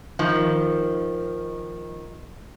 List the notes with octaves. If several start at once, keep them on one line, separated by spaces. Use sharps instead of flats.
D#3 F3